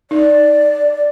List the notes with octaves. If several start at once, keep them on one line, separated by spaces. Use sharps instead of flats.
D#4 D5